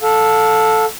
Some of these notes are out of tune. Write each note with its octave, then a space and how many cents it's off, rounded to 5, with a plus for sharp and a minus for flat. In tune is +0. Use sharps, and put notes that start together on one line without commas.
A4 +0 F5 +35